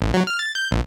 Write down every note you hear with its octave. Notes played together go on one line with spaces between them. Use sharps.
A1
F#3
F6
A6
G6
A#1